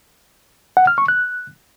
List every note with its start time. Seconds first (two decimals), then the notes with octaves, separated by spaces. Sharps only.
0.77 F#5
0.87 F6
0.98 C#6
1.08 F#6